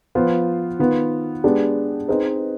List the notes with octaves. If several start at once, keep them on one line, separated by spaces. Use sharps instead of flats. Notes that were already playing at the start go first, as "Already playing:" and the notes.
F3 B3 F4 C5
D#3 B3 F4
G#3 B3 D4 G4
C4 D#4 G#4 B4 D#5